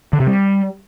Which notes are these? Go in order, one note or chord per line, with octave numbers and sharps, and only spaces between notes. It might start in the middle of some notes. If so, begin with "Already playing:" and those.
D3
C3
G3